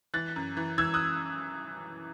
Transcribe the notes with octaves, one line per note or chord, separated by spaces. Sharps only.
E3 F#6 A6
F#2
E3
E3 E6 G#6
D#6 F#6